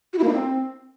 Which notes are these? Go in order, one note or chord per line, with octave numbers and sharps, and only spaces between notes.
F#4
E4
A#3
D#4
C4